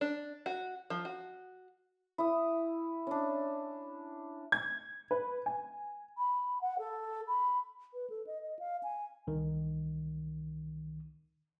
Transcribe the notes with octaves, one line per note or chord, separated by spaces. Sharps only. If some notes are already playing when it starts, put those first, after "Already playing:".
D4
F#4
F3
F#4
E4 D#6
C#4 D4
G#6
B4
G#5
B5
F#5
A4
B5
B4
A4
D#5
D#5
F5
G#5
C2 D#3